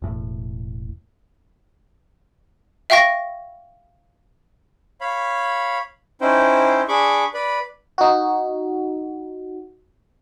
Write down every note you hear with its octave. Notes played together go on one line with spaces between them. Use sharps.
E1 A2
E5 F5 G5 C#6 A#6
C#5 F5 B5
C#4 D#4 E4 C5 G5
D4 G#4 B5 C#6 D6
B4 D5 B5
D#4 F#4